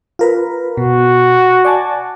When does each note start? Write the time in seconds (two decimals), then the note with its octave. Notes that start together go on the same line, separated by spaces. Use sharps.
0.19 F4 A#4 B4
0.77 B2 F#4
1.65 D5 G#5 A5